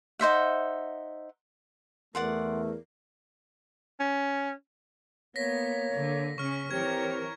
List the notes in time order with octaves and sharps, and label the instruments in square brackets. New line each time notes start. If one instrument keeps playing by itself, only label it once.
[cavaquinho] D#4 C5 E5 F#5
[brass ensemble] E2 [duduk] A3 [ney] A#4 [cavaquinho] D5 F#5 C6
[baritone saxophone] C#4
[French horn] A#3 [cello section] B3 [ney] C#5 [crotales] A#6 B6
[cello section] D3
[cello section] C#3 C#4 [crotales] C#6 F6
[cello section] E3 A#4 C#5 [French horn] C4 [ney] G4 [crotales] G#6